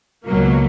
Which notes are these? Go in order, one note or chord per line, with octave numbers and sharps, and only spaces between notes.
C#2 B2 F#3 A#3